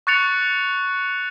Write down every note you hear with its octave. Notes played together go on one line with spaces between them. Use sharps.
C#6 F#6 A6 C#7 F7